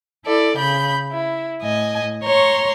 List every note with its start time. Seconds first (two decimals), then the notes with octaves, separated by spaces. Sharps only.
0.24 E4 A4 D5
0.57 C#3 B5 G6
1.12 E4
1.61 A2 D#5 G#5
2.23 C#5 A#5 C6 C#6